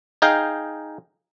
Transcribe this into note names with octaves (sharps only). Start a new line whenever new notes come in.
D#4 G#4 D#5 F5 G5